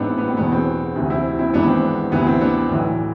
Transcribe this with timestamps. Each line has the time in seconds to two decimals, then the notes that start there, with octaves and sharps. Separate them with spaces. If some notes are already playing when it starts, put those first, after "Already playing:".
Already playing: A1 G#2 E3 B3 C4 D4
0.18 B3
0.27 C4
0.37 E1 E2 B2 B3
0.52 C4
0.96 D2 C3 E3
1.10 C4 E4
1.39 C4 E4
1.54 G#1 G#2 E3 B3 D4
1.68 C4
2.12 D2 C3 E3 B3
2.26 C4
2.41 B3 D4
2.70 B1 A2 E3